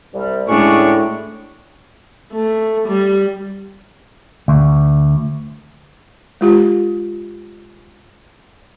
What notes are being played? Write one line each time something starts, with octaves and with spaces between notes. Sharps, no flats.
C2 G3
D2 A2 G#3 C#4 D4 C#6
A3
G3
D2
G#3 F4 G4